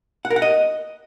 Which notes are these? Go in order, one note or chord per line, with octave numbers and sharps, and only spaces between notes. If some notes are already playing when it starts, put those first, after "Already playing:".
F#5
A#4
F#5
D#5